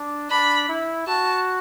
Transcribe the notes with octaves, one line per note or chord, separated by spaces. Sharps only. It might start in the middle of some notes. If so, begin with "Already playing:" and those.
Already playing: D4
D4 B5
E4
F#4 A5